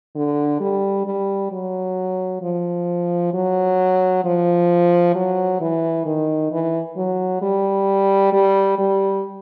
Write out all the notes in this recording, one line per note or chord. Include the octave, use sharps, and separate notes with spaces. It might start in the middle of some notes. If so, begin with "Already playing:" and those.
D3
G3
G3
F#3
F3
F#3
F3
F#3
E3
D#3
E3
F#3
G3
G3
G3